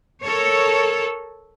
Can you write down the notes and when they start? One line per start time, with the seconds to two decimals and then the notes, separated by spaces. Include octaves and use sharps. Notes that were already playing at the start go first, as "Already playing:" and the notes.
0.24 A4 A#4 C#5